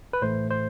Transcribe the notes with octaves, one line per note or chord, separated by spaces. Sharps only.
B4
A2 E3 A3 C5
C5